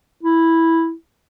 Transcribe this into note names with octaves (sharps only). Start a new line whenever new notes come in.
E4